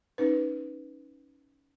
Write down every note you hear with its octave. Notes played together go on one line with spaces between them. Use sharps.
C#4 D#4 B4